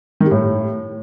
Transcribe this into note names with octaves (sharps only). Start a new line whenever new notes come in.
D#3
G3
A2